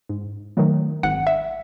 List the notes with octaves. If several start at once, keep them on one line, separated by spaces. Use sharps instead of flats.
G#2
D#3 F#3 A3
G#1 F#5
E5